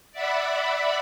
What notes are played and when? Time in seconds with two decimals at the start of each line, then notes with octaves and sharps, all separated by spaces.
0.12 D5 E5 F#5 B5